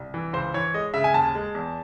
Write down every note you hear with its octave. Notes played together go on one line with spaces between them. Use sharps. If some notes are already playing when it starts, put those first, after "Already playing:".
Already playing: C2
E3
C#2 C5
E3 C#5
G#3 D#5
C#3 E5
G#5
D#2 A5
G#3
E2